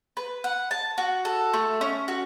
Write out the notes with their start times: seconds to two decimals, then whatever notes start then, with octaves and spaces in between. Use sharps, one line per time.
0.17 B4
0.44 F#5
0.71 A5
0.98 F#4
1.25 A4
1.54 A3
1.81 C#4
2.08 F#4